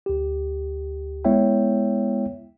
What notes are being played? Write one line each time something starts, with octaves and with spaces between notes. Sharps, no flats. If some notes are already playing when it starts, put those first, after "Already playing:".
D2 G4
G#3 B3 E4 C#5 E5 G5